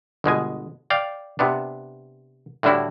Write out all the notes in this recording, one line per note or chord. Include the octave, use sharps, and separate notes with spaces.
G1 B2 G#3 G#5
D5 F5 G5
C3 B3 D4
A2 D3 G3 D4 E4 F#4